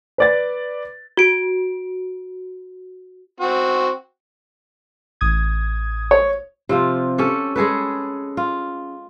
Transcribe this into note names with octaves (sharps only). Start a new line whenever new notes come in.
B4 D5 A6
F#4 D7
C4 F#4
A1 D#6 G#6
C#5
C3 F3 F4
C#4 G4 A4
G#3 G#4 A4 B4
F4